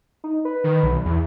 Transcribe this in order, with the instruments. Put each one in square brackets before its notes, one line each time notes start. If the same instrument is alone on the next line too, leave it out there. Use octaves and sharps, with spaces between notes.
[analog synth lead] D#4
B4
[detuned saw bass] D#3
B1
E2